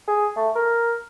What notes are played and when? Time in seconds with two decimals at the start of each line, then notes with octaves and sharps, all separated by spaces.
0.08 G#4
0.36 A3
0.55 A#4